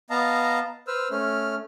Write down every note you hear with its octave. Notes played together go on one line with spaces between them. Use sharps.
B3 D#5 F5 A5 A#5
B4 C5 E6 F6
A3 C#4 F6